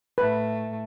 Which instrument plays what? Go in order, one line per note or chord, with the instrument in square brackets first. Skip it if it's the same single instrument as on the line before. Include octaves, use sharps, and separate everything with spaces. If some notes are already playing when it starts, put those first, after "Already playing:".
[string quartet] A2 A3 [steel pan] B4